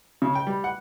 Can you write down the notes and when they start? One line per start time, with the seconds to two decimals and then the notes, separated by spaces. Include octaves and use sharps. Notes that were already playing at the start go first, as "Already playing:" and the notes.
0.22 C#3
0.35 G5
0.47 G3
0.64 F#5